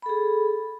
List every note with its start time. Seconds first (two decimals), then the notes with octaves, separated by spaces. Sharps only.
0.02 B5
0.06 A4
0.09 G#4